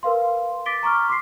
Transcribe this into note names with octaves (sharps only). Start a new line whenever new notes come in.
A#4 B4 F5 C6
D6 A6 B6 D7 G7
A#5 C#6 D6 F6
C6 D6 B6 C7